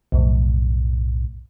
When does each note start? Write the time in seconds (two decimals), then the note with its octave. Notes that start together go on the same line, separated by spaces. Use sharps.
0.12 B1 F2 A2